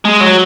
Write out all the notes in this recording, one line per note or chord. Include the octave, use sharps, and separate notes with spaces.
G#3
F#3